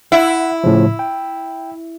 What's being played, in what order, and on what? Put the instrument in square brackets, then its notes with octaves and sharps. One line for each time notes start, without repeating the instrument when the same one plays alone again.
[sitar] E4 [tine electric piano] F#5
[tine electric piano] A2 C#3 F3
G5